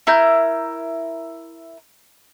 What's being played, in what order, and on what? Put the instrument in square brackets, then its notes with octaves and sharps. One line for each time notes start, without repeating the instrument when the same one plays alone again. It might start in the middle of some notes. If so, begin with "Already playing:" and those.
[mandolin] E4 A#4 G6